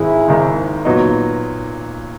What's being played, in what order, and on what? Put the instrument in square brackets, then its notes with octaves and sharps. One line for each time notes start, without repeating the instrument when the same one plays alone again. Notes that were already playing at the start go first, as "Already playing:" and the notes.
Already playing: [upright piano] G#1 G#2 D#3 [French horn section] E4 G#4
[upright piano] G#1 G#2 D#3
A#2 F#3 B3 D#4